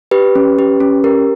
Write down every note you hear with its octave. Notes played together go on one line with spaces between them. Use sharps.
G4 B4
C#4
G4
C#4
G4 A#4